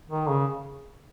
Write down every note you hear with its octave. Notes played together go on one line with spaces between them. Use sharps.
D#3
C#3